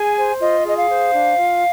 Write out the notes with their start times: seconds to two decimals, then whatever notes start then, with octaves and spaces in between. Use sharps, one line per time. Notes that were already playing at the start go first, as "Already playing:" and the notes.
Already playing: G#4 G#5
0.16 C5
0.40 F4 D#5
0.64 G#4 D#5
0.77 F5
0.89 C5
1.13 D4
1.38 F4